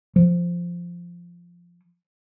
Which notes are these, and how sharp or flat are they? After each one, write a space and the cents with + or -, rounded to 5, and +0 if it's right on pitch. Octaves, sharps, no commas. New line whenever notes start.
F3 -5